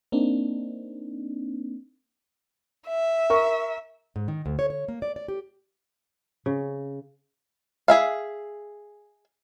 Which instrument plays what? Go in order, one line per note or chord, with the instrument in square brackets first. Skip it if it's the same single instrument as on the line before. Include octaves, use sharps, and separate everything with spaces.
[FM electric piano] A#3 C4 D4 D#4
[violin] E5
[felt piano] A#4 C#6
[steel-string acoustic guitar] G#2
D#3
D2
C#5
C#5
A#3
D5
D5
G4
[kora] C#3
[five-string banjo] G#4 E5 F5